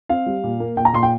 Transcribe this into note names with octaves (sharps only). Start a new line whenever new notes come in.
C4 F5
G3
A#2
A#3
A#2 G5
A#5
A#2 C6
G5